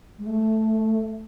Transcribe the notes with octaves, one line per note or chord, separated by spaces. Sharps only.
G#3
A3